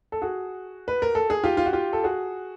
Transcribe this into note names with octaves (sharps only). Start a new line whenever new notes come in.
A4
F#4 G#4
B4
A#4
A4
G#4
F4 G4
F4
F#4
F4 G4
A4
F#4 G#4